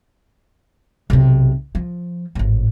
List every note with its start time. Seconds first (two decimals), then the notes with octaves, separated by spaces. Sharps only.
1.10 B1 C3
1.75 F3
2.35 G#1 A2